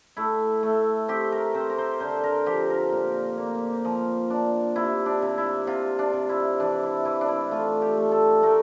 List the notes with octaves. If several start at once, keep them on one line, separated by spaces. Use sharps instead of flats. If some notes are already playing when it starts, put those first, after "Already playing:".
A3 E4
A3
C4 G4
A#4
C4 C5
A#4
C5
D3 C5
A#4
F3 G4
A#4
A#2
A#3
F3
D4
C3 E4
D4
C3
E4
C3 F4
D4
C3
E4
E3 D4
E4
E3 E4
D4
E4
A3 F4
G4
A3
A4
A3 A#4